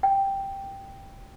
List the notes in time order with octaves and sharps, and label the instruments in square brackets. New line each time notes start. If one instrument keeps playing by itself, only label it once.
[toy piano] G5